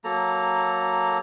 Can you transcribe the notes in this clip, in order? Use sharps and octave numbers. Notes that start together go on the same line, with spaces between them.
F#3 A#3 A4 A#5